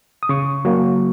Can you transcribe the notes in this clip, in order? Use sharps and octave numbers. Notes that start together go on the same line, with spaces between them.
D#6
C#3 C#6
F#3 A#3